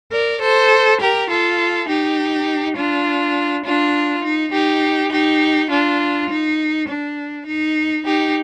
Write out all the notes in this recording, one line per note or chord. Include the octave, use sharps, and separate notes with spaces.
A#4 D5
A4 C5
G4 A#4
F4 A4
D#4 G4
D4 F4
D4 F4
D#4
D#4 G4
D#4 G4
D4 F4
D#4
D4
D#4
D#4 G4